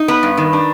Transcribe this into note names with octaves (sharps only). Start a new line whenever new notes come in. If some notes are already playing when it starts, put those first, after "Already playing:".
Already playing: D#4
B3 B4
G2
D#3
D4